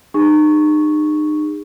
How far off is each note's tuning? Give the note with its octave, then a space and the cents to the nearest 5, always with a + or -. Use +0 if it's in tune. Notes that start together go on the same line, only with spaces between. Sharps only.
D#4 -35 G#4 -35 C#6 -5